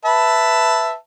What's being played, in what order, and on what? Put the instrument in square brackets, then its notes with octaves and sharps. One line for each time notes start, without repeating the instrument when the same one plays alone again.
[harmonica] B4 E5 A5